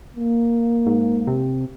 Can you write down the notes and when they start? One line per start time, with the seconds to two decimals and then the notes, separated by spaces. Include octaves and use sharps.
0.16 A#3
0.86 G#2
1.27 C3